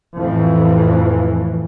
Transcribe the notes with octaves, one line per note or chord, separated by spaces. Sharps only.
F2 A2 E3